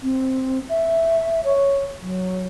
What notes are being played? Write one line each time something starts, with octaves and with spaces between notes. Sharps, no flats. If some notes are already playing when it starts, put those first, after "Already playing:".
C4
E5
C#5
F#3